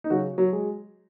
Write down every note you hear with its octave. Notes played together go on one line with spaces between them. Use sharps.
D#4
C#3 F#3 F#4
F#3 F#4
G#3